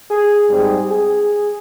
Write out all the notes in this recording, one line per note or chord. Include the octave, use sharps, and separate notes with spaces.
G#4
G#2 G3 C4
G#4